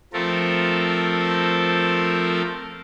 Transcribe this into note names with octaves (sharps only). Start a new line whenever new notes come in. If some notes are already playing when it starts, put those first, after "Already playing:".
F3 A3 C4 A4 A#4